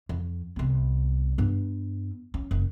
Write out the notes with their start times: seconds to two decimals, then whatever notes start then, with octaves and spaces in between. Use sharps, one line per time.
0.09 F2
0.56 C2 B3
1.38 G2 B3
2.34 C#4
2.51 F#1